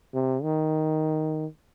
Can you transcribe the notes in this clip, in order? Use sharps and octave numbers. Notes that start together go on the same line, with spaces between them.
C3
D#3